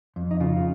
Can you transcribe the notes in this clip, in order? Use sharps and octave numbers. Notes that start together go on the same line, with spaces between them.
F2
D#4
C#3 F4
F4